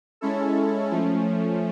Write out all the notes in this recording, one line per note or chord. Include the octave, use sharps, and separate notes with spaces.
G#3 C#4 E4 A4
F3 A3 C#4